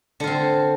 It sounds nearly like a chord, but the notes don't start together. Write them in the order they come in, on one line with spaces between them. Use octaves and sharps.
D3 F4 C4